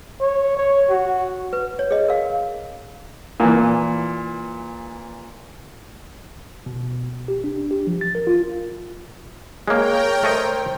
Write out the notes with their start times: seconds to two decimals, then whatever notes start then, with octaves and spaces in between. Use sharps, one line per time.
0.21 C#5
0.57 C#5
0.90 F#4
1.53 B4
1.79 C#5
1.91 G#4 D#5
2.08 A#4 F5
3.40 A#2 E3
6.66 B2
7.28 G4
7.44 D4
7.71 G4
7.87 F3
8.01 A6
8.15 A#4
8.27 F4
9.68 G#3 A#3 A#4 C#5 G5
10.24 A3 C5 C#5 D#5